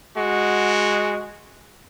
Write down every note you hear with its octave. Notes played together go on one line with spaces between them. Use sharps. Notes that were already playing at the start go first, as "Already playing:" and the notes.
G#3 F#4